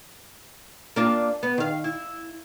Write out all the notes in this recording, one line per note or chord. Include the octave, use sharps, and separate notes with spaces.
A#3 D4 F4
B3
D#3 F5
E4